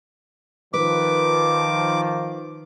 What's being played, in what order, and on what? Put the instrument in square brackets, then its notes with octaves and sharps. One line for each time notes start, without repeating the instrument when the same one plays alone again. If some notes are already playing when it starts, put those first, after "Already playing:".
[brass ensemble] D#3 F3 [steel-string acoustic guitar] B4 [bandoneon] D6